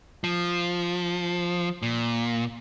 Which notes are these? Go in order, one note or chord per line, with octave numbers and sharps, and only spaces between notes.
F3
A#2